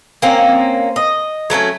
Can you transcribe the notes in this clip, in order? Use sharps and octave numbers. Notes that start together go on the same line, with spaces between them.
A#3 C4 C#4
D#5
F#3 A3 B3 C#4